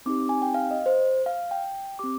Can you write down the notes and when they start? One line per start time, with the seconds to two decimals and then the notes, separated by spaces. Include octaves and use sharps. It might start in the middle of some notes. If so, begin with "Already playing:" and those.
0.06 C4 D#4 G4 D6
0.29 G#5
0.42 G5
0.54 F5
0.71 D#5
0.86 C5
1.26 F5
1.51 G5
1.99 C4 G4 D6